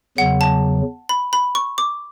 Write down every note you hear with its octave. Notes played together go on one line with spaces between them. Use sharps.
E2 C#3 F#3 F#5
A5
B5
B5
C#6
D6